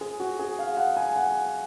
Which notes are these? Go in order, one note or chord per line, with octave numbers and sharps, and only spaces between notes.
G#4
F#4
G#4
F5
F#5
G#5
F#5